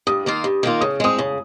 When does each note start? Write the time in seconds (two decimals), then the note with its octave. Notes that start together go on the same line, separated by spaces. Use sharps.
0.07 G2 D#6
0.26 D#3 A#3 F4
0.44 G2
0.63 D#3 A#3 F4
0.81 C#3 D#6
1.00 G#3 C4 D#6
1.19 C#3